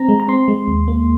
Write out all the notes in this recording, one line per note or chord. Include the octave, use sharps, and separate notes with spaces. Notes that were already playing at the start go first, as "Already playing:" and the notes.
Already playing: C4 A#5
G#3
A#5
C4 C6
G#3
D#2
A#3